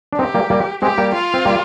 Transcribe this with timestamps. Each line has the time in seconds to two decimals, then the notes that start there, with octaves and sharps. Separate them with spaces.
0.13 D4
0.18 C4 D#4 G4
0.34 G3 A#3
0.50 G3 A#3
0.82 G#3 C4 G4
0.98 G3 A#3
1.14 F4
1.34 C4
1.45 G3 A#3